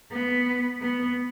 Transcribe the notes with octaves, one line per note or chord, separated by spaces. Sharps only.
B3
B3